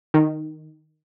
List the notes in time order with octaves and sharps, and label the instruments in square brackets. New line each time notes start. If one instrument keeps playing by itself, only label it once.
[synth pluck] D#3